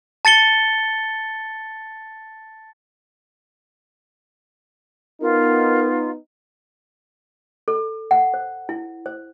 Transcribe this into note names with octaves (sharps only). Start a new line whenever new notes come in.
A5 A6 C#7 G7
B3 D#4 F4 A#4
A4
F#5
C5
E4
C5